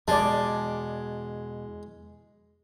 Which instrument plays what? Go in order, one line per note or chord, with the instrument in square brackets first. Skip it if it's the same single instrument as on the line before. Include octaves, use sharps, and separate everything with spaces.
[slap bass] E2 B2 [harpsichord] G#3 [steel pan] D5 A5